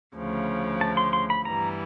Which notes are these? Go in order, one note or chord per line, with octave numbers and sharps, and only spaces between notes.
D2 C#3 F3
A5
C6
C6
B5
G2 E3 G3 B3 A#5